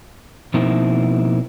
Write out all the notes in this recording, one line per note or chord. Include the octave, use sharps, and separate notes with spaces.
B2 F3 A#3 C4 D#4 E4